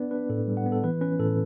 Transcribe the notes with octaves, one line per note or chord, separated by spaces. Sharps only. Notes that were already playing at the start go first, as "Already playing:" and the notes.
Already playing: B3 D4 B4 D5
D4 B4
A2 A4
G3
F#5
B3
A4
E3 B4
C#4 B4
A2 A4